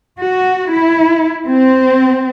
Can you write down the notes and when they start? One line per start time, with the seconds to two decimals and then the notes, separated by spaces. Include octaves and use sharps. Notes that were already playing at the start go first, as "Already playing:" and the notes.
0.19 F#4
0.71 E4
1.48 C4